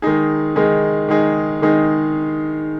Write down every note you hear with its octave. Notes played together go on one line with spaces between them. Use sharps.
D#3 G#3 D#4 G#4
D#3 G#3 D#4 G#4
D#3 G#3 D#4 G#4
D#3 G#3 D#4 G#4